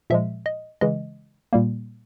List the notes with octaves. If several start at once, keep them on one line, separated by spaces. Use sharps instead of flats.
A#2 F3 G#3 E5
D#5
C#3 E3 G#3 D#5
A#2 G3 A#3